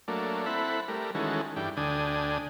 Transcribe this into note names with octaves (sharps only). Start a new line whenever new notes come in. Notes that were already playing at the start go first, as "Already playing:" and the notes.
F#3 A3 A#3 D4
C4 E4 A4 F#5 B5
G3 A3 A#4
D#3 E3 G#3 C#4 F#4 A4
G2 E3 D4 G5
D2 D3 D4 G5 G#5 D#6